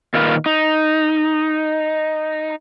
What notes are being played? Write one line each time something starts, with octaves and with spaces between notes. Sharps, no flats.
A#2 D#3 F4 A#4 B4
D#4